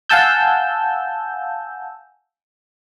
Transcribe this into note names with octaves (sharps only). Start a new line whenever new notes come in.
F5 F#5 G#5 A5 E6 G6